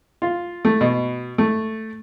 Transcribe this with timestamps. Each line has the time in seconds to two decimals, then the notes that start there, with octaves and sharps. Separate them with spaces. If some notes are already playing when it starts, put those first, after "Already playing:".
0.22 F4
0.65 A3
0.81 B2
1.38 A3